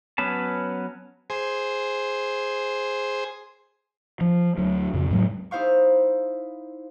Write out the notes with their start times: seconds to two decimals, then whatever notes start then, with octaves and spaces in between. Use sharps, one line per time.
0.18 F#3 B3 C#4 B4 A5
1.30 G#4 C5
4.21 F3
4.57 D2 F#3
4.94 F2 C#3
5.11 A2 F#3 G#3
5.51 D#4 E4 C5 F5 C#6